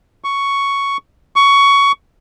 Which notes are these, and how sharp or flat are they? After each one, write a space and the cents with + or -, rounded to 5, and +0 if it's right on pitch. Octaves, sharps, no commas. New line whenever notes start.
C#6 +5
C#6 +15